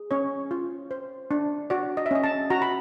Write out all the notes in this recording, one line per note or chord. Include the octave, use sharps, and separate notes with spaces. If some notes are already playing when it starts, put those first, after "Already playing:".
Already playing: G#4
C#4 C#5
F4
C5
D4
F#4 D5
D#5
E5
C#4 D#5
A5
F#4 A#5
B5